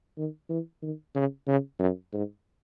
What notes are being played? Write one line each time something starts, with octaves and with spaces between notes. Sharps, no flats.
D#3
E3
D#3
C#3
C#3
F#2
G#2